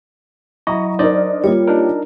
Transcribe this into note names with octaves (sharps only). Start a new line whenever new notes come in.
F#3 E4 D#5 A#5 C#6
D4 D#4 A#4 C5 D5 D#5
G3 A#3 F4 C#5
D4 D#4 A#4